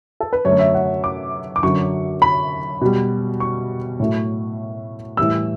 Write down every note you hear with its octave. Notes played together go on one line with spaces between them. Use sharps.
A4
B4
F#2 D3 F#3 A3 C#5
E5
F#5
D6
D6
F#2 D3 F#3 C#6
B5
B2 G3
C#6
A2 F#3 A3
A2 E3 G3 E6